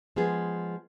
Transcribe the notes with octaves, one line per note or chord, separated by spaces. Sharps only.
F3 G#3 B3 G#4